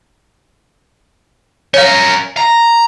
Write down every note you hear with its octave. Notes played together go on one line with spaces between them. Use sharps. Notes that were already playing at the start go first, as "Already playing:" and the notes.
C#4 A#4 C#5 F5
A#5